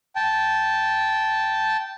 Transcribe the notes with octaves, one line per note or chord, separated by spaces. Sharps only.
G5 A5